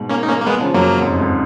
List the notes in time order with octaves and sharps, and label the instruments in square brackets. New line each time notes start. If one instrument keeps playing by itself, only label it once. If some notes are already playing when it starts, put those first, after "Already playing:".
Already playing: [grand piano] G#2 B2
[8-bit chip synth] A#3 C#4
D#4
A#3 C#4
A#3
G#3 B3
[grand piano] C#3 F3
[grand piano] F#2 [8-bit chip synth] F#3 A#3
[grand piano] F2 G#2
F2 G#2